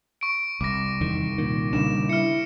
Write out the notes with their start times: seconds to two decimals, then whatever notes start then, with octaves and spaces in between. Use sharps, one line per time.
0.21 C#6 D7
0.61 C2 D6 A#6
1.01 E2 D#3
1.38 A#2 D#3
1.73 C#3 G3 D4 E7
2.09 E4 F6 C#7